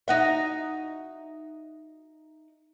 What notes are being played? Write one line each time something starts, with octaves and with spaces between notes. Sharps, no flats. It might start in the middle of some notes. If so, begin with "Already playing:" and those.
D#4 F#4 E5